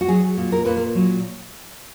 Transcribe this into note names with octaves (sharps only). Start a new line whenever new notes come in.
F#4
F#3 G#4
A#2
A#4
A#2 B4
A#4
F#3